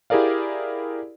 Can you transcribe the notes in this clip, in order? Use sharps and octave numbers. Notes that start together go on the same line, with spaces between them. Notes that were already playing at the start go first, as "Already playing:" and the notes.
E4 G4 G#4 A#4 D5 F5